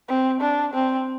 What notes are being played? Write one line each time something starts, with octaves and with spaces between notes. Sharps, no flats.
C4
D4
C4